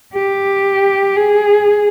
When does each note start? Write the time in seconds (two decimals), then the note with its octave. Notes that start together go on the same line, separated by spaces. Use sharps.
0.14 G4
1.16 G#4